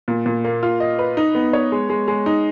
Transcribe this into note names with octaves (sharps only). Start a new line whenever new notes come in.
A#2
A#2
A#3
F4
D#5
B4
D#4
B3
C#5
G#3
G#3
G#3
D#4